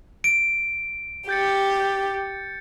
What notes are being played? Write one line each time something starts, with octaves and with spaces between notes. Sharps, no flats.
D7
G4 G6 A6 C#7